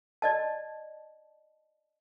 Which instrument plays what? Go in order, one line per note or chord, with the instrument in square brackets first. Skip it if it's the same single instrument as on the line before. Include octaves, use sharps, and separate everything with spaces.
[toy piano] D5 D#5 A5